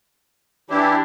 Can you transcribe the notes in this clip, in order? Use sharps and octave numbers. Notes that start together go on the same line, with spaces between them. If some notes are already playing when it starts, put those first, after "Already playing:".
E3 D4 E4 G4